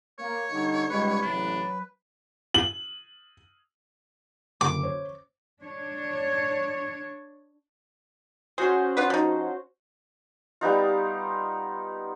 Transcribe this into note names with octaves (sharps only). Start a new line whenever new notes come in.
A#3 C#5
D3 G3 D#4
C#2 G#2 G3 G#3 B4
A1 C3 F#3 D4
F#7
F#1 D3 D6
C5 C#5
D4 C#5
C#4 F#4 G#4 C5
B3 F4 B4
F3 D#4
G3 B3 D#4 F4